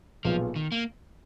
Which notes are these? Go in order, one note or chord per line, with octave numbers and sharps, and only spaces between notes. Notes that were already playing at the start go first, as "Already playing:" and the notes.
B1 A#2 F3 G#3 B3 F4
D#3
A#3